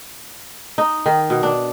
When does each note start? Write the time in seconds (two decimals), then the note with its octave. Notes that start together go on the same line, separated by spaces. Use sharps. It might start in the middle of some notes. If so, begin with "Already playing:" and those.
0.78 D#4
1.06 D#3
1.30 B2
1.43 D4